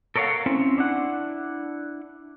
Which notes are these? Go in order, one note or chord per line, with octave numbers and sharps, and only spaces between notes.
A4 A#4 C#5 D5 F5 F#5
C4 C#4 E4
D4 E4 F#5